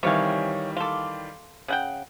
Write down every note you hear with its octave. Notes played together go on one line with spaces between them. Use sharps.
C3 D#3 E3 G3 C#5 F5 G#5
A4 F5 C6 D6
C#3 F#5 G5